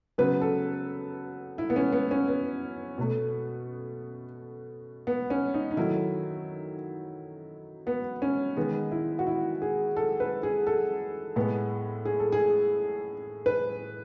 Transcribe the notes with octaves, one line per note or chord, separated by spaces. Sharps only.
C#3 F#3 B3 B4
A4
E4
B3
C#4
B3
C#4
B3
B2 A3
B3
C#4
D#4
D#4
D#3 F#3 A3 E4
B3
C#4
D#3 G#3 B3
E4
F#4
E4
G#4
A4
B4
G#4
A4
A2 G#3 B3
G#4
A4
G#4
B4